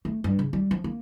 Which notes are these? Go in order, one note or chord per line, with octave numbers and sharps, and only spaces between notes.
A3
G2
C#3
G3
F3
A#3